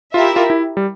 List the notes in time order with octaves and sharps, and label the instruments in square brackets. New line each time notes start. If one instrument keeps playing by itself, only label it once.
[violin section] E4 G4 A#4 E5 [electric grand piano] F4
[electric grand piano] F4
E4
G3